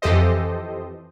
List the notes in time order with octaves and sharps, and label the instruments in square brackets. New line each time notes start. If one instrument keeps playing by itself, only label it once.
[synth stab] F2 E3 G4 A4 C5 D#5